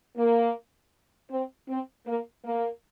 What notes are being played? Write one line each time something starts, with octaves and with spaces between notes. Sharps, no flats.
A#3
C4
C4
A#3
A#3